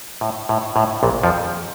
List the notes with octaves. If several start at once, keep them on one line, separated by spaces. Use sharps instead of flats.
A2
A2
A2
A#1 A#2
F2 F3